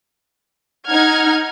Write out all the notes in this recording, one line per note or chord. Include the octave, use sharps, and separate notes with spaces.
D#4 F#5 F6 G#6